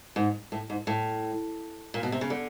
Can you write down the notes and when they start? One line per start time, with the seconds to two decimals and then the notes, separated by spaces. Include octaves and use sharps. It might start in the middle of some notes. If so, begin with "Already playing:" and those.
0.16 G#2
0.52 A2
0.70 G#2
0.87 A2
1.94 A#2
2.03 B2
2.12 C3
2.21 C#3
2.30 D3